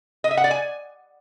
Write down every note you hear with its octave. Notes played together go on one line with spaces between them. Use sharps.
D#5
E5
F#5
D5
G#5